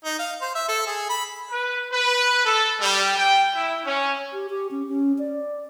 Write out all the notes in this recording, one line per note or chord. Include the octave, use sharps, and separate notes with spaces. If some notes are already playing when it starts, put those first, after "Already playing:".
D#4
F5
C5
E5
A4
G#4
B5
B4
B4
A4
G3
G5
E4
C#4
G4
G4
C#4
C#4
D5